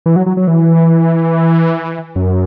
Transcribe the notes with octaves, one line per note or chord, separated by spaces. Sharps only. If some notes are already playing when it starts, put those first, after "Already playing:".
E3
F#3
F#3
F#3
E3
F#2